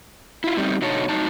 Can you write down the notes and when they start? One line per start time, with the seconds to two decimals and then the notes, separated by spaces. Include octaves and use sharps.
0.44 E4 F4
0.57 G3 A3 C4 D#4 G4
0.82 B2 D3 D#4 F#4 C#5 A5
1.09 A2 F#3 D#4 A5